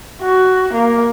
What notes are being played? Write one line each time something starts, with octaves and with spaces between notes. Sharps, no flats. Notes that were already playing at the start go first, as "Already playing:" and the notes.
F#4
A#3